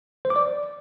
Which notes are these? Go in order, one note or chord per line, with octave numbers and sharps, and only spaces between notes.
C5
D6
D5